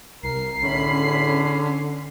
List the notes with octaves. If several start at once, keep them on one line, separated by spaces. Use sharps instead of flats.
C2 A#4 C7
E2 A2 D3 C#4 B5